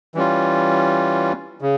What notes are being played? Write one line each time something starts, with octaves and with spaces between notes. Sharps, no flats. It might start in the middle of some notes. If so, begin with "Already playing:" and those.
E3 G3 C#4 F4
C#3